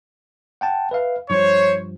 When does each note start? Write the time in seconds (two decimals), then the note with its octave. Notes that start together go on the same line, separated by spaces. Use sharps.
0.61 F#5 G5 A5
0.91 B4 E5 F5
1.30 G2 F3 C5 C#5